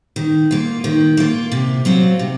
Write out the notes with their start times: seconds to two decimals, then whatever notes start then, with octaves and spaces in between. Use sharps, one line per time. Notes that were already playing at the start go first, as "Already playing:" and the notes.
0.16 D#3
0.51 A#3 F4
0.84 D#3
1.17 A#3 F4
1.52 C3
1.85 F#3 C4 F4
2.19 C3